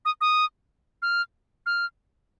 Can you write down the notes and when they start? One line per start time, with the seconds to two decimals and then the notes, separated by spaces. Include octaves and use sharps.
0.05 D#6
0.21 D#6
1.02 F6
1.66 F6